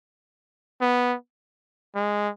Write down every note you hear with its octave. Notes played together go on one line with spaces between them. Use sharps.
B3
G#3